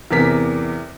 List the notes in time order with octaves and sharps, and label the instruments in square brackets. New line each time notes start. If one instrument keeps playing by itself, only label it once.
[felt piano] E2 C3 A#4 B6